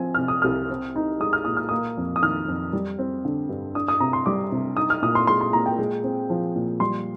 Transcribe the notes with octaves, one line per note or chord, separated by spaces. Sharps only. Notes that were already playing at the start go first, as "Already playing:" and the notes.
Already playing: F3 C4 G#5
C3 F6
D#6
C2 F6
C4
D#4
G#3 D#6
F6
A#2 D#6
F6
A#3 D#6
F2
D#6
D#3 F6
F2
G3
C4
D3
G2
D4 D#6
D#6
C3 A#5
C6
G3 D6
C3
D#4 D#6
F6
A#2 D#6
C6
G#3 C6
C6
A#2 A#5
G5
G#3
C4
F3
A#2
G3 C6